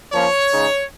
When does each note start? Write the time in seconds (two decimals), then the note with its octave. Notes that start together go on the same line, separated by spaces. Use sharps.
0.12 F3 A#3 C#4 C#5
0.52 C#3 G#3 D#4